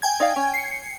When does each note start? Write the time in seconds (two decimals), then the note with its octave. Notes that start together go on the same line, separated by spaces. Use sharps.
0.02 G5 G#5 G#6
0.20 D#4 D5 F5
0.36 C#4
0.54 C7 C#7